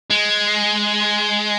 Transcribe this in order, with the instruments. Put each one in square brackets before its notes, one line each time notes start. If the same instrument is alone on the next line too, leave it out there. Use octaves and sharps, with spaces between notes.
[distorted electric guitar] G#3